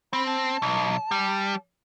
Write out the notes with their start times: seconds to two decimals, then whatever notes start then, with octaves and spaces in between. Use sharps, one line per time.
0.13 C4 B5
0.26 A5
0.62 B1
1.11 G3